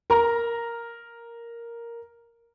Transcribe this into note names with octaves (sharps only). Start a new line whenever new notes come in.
A#4 A#5